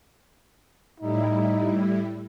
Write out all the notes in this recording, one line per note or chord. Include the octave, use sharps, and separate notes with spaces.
A2 G3 D#4 E4